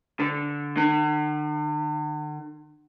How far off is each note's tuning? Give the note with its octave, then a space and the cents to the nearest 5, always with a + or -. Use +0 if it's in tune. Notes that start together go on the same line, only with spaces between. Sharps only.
D3 -10
D3 +45